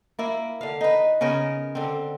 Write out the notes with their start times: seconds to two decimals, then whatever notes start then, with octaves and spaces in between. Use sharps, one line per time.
0.19 A#3 E4
0.61 D3 F5
0.81 D#4 B4
1.21 C#3 B3 C#4 A#4
1.75 D3 C4